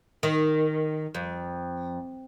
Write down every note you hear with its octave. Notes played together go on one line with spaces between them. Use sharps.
D#3
F2